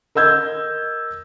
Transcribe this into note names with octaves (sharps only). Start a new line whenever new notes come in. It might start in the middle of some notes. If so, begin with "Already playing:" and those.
A#4 D#5 E6 G6 G#6